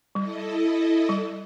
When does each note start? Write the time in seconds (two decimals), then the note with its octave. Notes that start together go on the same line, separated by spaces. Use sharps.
0.15 G3 E4 A4 D#5
1.09 G3